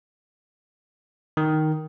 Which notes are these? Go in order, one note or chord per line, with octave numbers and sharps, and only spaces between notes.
D#3